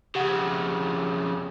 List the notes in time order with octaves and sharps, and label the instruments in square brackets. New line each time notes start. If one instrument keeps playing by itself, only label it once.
[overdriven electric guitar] F2 C#3 [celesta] G4 F#5